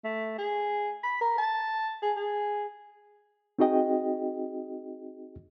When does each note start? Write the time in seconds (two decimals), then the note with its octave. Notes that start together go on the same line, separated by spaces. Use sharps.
0.04 A3
0.38 G#4
1.03 B5
1.21 A#4
1.38 A5
2.02 G#4
2.17 G#4
3.59 C4 D#4 F#4 G#4 D#5 G5